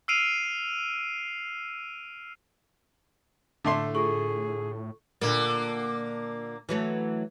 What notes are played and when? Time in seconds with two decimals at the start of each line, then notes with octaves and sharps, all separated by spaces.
0.08 E6 F6 C7 D7 D#7 F7
3.64 A2 D3 A3 C6
3.95 F4 G#4 A4 C#6
5.21 A#2 D3 A#3
6.69 E3 F#3 A3